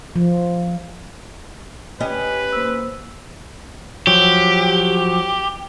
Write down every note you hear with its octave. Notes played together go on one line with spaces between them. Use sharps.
F3
C#4 G4 B4 D#5
A#3 C5 E6
F3 F#3 G4